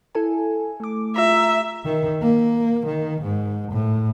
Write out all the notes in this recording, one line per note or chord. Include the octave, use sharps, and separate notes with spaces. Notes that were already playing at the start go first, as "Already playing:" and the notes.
E4 A4 G#5
A3 D6
F4 E5 A#5
D#3
A#3
D#3
G#2
A2